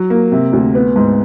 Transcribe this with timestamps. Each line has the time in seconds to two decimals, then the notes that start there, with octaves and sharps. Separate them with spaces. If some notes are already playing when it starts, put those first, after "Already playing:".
Already playing: F#3
0.10 A#3
0.32 C3
0.53 D2
0.75 B3
0.96 G#2